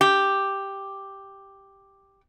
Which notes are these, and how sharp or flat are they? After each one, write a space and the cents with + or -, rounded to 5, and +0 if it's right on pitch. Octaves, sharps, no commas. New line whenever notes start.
G4 +0